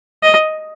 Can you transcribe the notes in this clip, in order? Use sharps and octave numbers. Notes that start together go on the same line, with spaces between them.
D#5